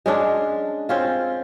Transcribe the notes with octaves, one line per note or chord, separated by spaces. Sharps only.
G#3 C#4 D4
C4 C#4 F4